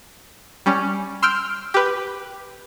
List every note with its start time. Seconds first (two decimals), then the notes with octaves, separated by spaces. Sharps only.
0.66 G3 C#4
1.22 C6 E6 F6 G6 D7
1.74 G4 B4